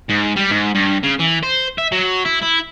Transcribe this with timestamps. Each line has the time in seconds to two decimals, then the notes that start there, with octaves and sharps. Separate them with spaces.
0.09 G#2
0.36 G3
0.50 G#2
0.75 G2
1.03 C#3
1.19 E3
1.43 C5
1.78 E5
1.92 F#3
2.26 E4
2.43 E4